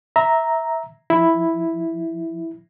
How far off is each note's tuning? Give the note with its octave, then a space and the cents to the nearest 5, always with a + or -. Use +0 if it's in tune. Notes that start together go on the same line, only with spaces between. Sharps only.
E5 -15 A#5 +0
F3 +0 E4 +0